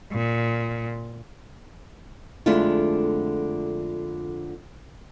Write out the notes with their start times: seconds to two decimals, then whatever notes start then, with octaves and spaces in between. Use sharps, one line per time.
0.12 A#2
2.46 F2 D3 G#3 A3 E4 F4